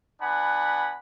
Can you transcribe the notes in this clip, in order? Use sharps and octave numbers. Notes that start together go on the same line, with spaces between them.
B3 D4 F#5 G#5 B5